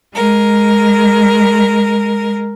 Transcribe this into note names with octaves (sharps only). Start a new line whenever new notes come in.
G#3 A#4